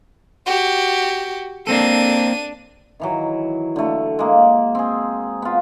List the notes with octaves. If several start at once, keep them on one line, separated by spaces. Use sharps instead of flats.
F#4 G4
A#3 C4 D4 A4 D#7
D#3 E3 F#3
D3 A3
G#3 A#3
C4 G#4
B3 F4